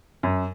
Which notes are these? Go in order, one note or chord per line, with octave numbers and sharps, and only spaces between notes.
F#2